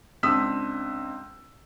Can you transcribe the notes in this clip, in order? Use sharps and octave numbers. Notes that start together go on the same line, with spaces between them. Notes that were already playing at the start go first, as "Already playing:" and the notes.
C#2 C4 D4 D#6 E6 B6